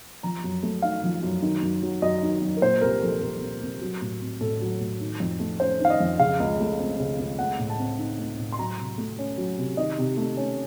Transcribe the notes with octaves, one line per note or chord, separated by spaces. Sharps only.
F3 A#5
F#2
A3
D#4 F5
F3
F#2
D#3
F#2
F#3
F#2 D#5
D#3
F#2
A#4
A#2 C5
C2 A#4
F3 A4
C2 A#4
A#2
C2
F#3
A2
C4
A2 A4
F#3
A2
D#3
F2
A3
C#4 C5
D#3 F5
D#5
F2
C#3 F5
C#2
A3
C4
C#3
C#2
A3 F#5
A2
A5
C4
D#4
A3
A2
C6
F#3 A#5
C3
A3
C#4
F#3
C3
D#3 D#5
C3
A3
C#4